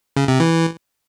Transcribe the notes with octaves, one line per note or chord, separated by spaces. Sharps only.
C#3
C3
E3